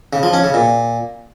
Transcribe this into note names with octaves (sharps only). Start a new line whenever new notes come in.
C#3
F3
C#4
C#3
A#2